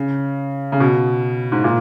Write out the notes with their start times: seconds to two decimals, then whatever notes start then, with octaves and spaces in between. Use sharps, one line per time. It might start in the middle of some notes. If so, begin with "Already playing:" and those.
Already playing: C#3
0.72 C#3
0.80 B2
1.52 G#2
1.64 A#2